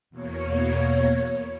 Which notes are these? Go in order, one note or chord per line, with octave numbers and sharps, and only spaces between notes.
E2 B2 A#3 C#5